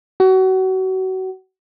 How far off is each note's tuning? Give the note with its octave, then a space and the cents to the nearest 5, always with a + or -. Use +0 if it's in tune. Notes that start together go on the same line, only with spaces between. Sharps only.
F#4 +30